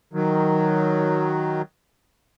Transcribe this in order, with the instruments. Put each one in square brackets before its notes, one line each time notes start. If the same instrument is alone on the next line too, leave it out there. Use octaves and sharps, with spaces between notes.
[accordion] D#3 F#3